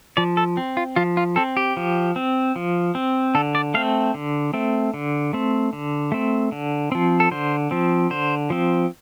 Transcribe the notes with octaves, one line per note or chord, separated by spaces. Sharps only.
F3 D5
A4
C4
F4
F3 F4
F4
C4 A4
G4
F3
C4
F3
C4
D3 A4
D5
A3 C4 F5
D3
A3 C4
D3
A3 C4
D3
A3 C4
D3
F3 C4
A4
D3 C5
F3 C4
D3 C5
F3 C4